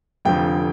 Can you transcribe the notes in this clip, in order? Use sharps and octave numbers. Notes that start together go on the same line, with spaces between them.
F1 F2 D3 F3 G5